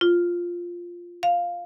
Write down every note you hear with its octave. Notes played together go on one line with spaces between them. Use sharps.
F4
F5